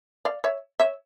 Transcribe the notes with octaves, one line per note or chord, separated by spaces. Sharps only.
D5 F5
C#5 E5
C#5 E5